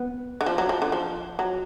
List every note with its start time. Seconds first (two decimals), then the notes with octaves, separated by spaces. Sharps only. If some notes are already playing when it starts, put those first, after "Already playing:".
Already playing: B3
0.41 D3
0.46 F3
0.58 F#3
0.69 F3
0.82 D3
0.92 F3
1.39 F#3